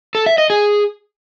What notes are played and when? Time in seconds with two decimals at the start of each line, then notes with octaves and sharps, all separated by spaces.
0.15 A4
0.26 E5
0.38 D#5
0.50 G#4